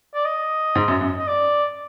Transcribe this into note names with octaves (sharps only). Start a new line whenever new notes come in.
D5
D#5
G#2
F#2
F#2
D#5
D5